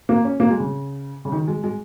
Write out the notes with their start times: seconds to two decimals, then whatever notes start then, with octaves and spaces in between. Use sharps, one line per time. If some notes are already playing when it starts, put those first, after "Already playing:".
0.09 A#3
0.24 C#4
0.40 A#3
0.50 G#3
0.60 C#3
1.25 C#3
1.32 D#3
1.48 G#3
1.64 G#3